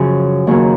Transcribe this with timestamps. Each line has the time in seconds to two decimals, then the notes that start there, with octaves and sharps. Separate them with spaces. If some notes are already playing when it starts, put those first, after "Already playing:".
Already playing: F#2 C#3 F3
0.47 D#2 C#3 F#3 A#3